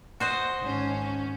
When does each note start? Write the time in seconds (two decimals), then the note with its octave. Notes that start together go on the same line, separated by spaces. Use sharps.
0.20 F#4 C5 D#5
0.60 G#1 C#4